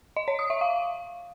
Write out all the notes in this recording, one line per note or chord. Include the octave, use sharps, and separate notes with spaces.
D#5
C#5
D#6
E5
F5